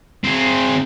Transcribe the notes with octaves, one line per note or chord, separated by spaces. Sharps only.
C4 G#4